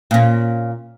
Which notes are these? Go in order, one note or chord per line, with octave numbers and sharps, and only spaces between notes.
A#2 C#4